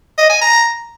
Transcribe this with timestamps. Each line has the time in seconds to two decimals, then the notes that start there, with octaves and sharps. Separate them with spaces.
0.18 D#5
0.30 G#5
0.42 A#5